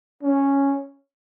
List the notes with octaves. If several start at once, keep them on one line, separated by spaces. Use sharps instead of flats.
C#4